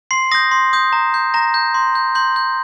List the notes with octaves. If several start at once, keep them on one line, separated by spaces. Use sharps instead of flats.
C6 C7
D#6 G6 A#6
C6
D#6 G6
A#5
G6
A#5 A#6
G6
C6
G6
C6 G6
G6